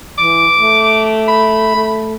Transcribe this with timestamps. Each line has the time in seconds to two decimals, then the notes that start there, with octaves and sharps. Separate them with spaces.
0.18 E3 D6
0.60 A3
1.28 B5
1.75 A3